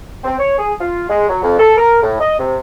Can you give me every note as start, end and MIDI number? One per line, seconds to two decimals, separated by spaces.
0.24 0.35 60
0.39 0.57 73
0.58 0.74 68
0.81 1.05 65
1.09 1.27 56
1.29 1.41 54
1.43 1.59 41
1.59 1.76 69
1.77 1.99 70
2.03 2.17 45
2.21 2.39 75
2.39 2.58 48